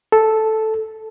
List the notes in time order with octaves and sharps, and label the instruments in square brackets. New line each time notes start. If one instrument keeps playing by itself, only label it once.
[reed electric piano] A4